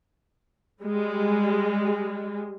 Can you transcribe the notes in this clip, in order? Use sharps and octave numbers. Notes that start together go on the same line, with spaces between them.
G3 G#3